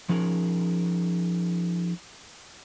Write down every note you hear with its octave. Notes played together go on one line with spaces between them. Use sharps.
F3 C#4 D#4 G#4 A#4